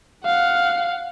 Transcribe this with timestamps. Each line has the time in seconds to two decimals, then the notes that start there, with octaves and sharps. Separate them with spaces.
0.25 F5 F#5